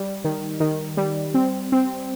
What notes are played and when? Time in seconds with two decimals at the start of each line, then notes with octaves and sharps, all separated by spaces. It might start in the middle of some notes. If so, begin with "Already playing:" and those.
Already playing: G3
0.24 D#3
0.60 D#3
0.97 G3
1.34 C4
1.72 C4